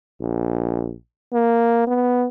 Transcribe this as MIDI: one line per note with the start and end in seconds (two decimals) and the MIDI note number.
0.21 0.94 34
1.33 1.84 58
1.87 2.27 59